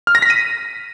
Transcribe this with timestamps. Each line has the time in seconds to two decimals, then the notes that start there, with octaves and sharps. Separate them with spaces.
0.07 F6
0.15 A#6
0.22 B6
0.30 D#7